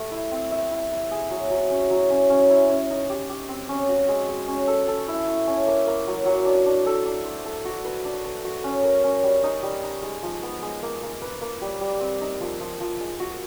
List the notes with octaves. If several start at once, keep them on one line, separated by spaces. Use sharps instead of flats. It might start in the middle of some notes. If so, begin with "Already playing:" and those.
Already playing: A3 G4 E5
E4
C4
E5
E4
E4
G#4
F#3
F#3
C#4
F#3
C#4
C#4
E4
C#4
D#4
G4
G4
C4
C#4
F#4
G#3
G#3
C#4
A4
A4
E4
E4
C#4
A#3
A#3
F#3
F#3
D4
D4
A4
D4
C5
A4
F#4
B4
D4
B4
F#4
C#4
A#4
C#4
G3
D#4
G3
D#4
G#3
F3
B3
G#3
A#3
A#3
B4
A#3
G3
G3
C4
D#4
F3
F3
F3
G#3
F#4